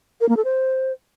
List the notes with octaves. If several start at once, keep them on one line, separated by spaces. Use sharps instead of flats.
A#4
A#3
A4
C5